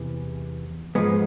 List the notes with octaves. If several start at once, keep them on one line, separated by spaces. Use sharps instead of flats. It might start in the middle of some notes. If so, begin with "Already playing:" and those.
Already playing: E2 C3 E3
G#2 F3 G#3 B3